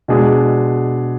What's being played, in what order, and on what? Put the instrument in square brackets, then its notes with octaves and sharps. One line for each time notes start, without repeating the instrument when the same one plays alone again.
[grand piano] B2 G#3 D4 G#4